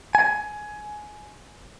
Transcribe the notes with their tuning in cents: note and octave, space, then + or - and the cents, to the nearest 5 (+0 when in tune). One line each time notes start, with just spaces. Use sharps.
G#5 +15